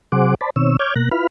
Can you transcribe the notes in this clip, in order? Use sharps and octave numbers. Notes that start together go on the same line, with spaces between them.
C3 F#3 G#4 C5 F#5 D6
C5 D5 A5 B5
B2 D#3 C4 C#5 E6
C#5 D6 F6 G6 G#6
B2 A#3 F#6 A#6
E4 F4 B4 B5 F6